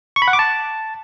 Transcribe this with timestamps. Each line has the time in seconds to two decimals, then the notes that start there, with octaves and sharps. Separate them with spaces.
0.16 C#6
0.22 B5
0.28 F#5
0.33 D6
0.39 A5